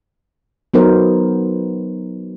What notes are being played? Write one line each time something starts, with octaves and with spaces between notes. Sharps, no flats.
F#3 B3 D#4 A#4 C5